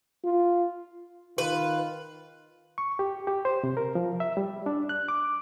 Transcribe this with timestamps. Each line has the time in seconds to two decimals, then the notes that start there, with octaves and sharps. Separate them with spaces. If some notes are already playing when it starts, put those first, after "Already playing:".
0.25 F4
1.38 D#3 F4 B4
2.78 C#6
2.99 G4
3.27 G4
3.45 C5
3.64 C3
3.77 A#4
3.95 F3
4.20 E5
4.37 G3
4.66 D4
4.89 F#6
5.08 D6